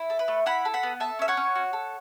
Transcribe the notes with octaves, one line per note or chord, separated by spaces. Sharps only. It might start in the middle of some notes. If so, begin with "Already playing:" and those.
Already playing: E4
A4
B4
A3
E4 F#5 B5
A4
F#5 B5
B3
A4 E5 A5
C#4 E5
C#5 F#5
C#4
F#4
A4